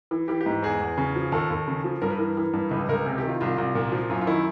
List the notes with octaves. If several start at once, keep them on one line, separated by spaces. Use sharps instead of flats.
E3
E3 G4
G4
G#2
E2 G#4
E2
C#3
F3
D#2 A4
D#2
C#3
F3
G2 A#4
B4
E3 A#4
E3
G2
C#2 B4
C#2 A#4
C3 G#4
D#3 G4
F4
C2 F4
C2
A#2
F3
F#2 F4
F4
D#3 E4